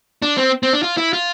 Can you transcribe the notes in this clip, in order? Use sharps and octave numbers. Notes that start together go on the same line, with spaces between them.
D4
C4
C4
D4
F4
E4
F4